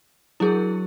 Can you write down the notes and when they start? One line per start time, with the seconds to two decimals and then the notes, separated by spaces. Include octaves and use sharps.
0.40 F#3 D4 E4 F#4 G#4 A#4